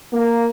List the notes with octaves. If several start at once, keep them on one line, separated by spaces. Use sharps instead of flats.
A#3